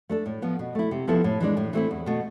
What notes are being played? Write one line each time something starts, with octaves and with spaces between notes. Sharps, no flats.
A3 D4 A4
A2
F3 B3
B2
A3 E4
C3
F3 B3 E4 A4
A2
E3 G#3 D4
A2
E3 A3 C4 E4
E2
B2 A3